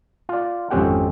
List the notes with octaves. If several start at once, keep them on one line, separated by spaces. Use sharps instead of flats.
F4 D5
G#1 F2 C4 C#4 G4 F#5